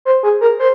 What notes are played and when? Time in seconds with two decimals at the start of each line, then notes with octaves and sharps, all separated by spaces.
0.05 C5
0.23 G#4
0.41 A#4
0.59 C5